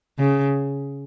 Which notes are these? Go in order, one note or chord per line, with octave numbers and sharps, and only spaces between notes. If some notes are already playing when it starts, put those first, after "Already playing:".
C#3